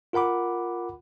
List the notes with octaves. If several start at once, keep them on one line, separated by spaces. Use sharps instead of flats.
F4 A#4 F#5 B5 D6